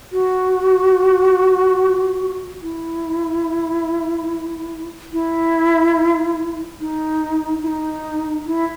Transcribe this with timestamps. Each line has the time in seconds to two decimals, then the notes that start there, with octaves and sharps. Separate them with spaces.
0.12 F#4
2.62 E4
5.13 E4
6.80 D#4
7.63 E4
7.67 D#4
8.46 E4